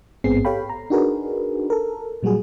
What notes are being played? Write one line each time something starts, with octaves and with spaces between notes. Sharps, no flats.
A1 G#2 B3 C4 G#4 C7
G4 A4 C#5 F5 G5 B5
A#5
D4 D#4 F#4 G#4 A#4 B4
A4 A#4
A#2 F#3 G3 F#4 G#4